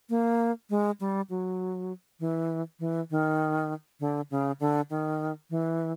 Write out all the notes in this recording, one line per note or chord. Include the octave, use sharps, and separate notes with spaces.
A#3
G#3
G3
F#3
E3
E3
D#3
D3
C#3
D3
D#3
E3